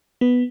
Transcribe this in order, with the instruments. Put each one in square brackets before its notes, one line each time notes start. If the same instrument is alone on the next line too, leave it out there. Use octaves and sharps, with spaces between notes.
[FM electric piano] B3